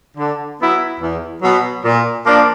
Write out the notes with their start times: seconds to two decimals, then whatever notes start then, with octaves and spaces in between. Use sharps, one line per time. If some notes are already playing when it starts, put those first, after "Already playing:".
0.17 D3
0.60 F#3 B3 E4
1.01 E2
1.42 B2 F#3 B3
1.84 A#2
2.25 F3 A#3 D4